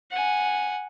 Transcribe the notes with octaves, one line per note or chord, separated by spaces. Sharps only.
F#5 G#5